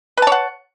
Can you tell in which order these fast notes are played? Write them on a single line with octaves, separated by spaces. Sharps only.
B4 A5 C#5 F#5